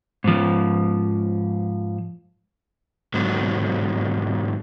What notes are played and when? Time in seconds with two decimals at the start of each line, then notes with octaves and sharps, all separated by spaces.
0.24 G#2 F3
3.14 G#2 D3 F#3